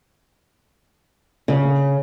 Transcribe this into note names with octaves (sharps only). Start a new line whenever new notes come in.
C#3